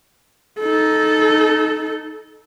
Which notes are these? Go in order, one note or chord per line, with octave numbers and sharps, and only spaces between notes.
D#4 A4